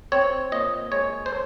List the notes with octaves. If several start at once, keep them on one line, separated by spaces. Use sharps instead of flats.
C4 C#5
A#2 D#5
G#3 C#5
C5